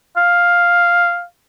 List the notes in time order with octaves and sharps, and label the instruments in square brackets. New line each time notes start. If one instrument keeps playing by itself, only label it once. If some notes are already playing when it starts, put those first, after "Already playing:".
[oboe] F5